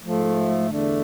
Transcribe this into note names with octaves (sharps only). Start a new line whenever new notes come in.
G#2 F3 A3
E2 D3 A3 D4